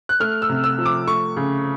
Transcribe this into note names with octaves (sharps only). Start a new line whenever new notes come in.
F#6
A3 F6
E6
C3
E6
F3
D6
A3 C#6
C#3